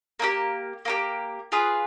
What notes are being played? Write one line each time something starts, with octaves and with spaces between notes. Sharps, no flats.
A#3 D#4 G4
A#3 D#4 G4
F4 G#4 B4